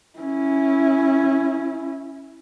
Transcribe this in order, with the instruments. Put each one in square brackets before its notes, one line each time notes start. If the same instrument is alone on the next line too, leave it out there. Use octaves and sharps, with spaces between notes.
[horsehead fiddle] C#4 E4